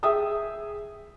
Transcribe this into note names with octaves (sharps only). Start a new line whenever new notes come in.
G#4 E5 G5 D#6 E6